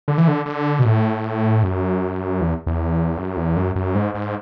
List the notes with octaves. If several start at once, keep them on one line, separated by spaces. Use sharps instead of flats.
D3
E3
D3
D3
B2
A2
F#2
E2
E2
F#2
E2
F#2
F#2
G#2
G#2